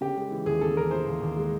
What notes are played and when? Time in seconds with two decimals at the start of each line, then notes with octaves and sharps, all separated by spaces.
0.01 C#3 G4
0.16 G#3
0.31 E3
0.46 D#2 G#4
0.61 C#3 A4
0.76 E3 A#4
0.91 E3 C5
1.07 D#2
1.21 D#2
1.37 G#3